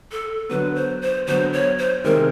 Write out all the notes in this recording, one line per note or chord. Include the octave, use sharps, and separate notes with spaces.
A4
D3 F#3 B3 B4
C5
C5
D3 F#3 B3 C5
C#5
C5
C3 D#3 G#3 C4 A#4